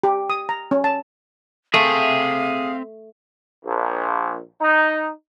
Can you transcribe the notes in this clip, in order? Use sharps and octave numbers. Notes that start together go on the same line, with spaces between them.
G4
D#6
A#5
C#4
A5
A3 C4 G#4 E5 F5
A#1
D#4